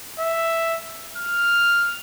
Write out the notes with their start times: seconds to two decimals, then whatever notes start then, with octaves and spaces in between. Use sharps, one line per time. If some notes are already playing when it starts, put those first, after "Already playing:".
0.19 E5
1.17 F6